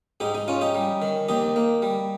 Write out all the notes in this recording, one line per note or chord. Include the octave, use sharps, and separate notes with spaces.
G#2 D#4 G4
D#4
C#4 F4
D#4 G4
G3
D#3
D#2 D#4 G4
A#3
G3